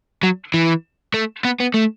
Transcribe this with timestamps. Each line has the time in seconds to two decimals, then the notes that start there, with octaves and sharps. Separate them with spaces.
0.23 F#3
0.54 E3
1.14 A3
1.45 B3
1.60 B3
1.74 A3